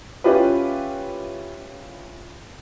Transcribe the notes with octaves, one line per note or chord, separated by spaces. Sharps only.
C#4 E4 F4 G4 B4